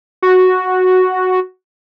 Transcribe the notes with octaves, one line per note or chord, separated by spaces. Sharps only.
F#4